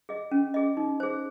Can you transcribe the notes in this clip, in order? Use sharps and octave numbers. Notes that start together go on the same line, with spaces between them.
G#4 D#5
C#4
G#4 D#5
D#4
G#4 C5